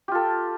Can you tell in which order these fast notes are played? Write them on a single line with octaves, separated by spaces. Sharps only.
G4 F4 A4